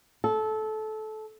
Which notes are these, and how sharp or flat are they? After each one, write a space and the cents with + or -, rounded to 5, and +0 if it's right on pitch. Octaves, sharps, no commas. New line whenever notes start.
A4 -20